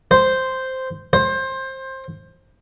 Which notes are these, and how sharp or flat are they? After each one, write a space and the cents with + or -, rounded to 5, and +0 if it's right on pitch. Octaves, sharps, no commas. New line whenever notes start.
C5 -5
C5 +20